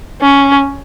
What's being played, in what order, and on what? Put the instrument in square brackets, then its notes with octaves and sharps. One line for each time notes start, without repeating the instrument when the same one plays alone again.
[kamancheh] C#4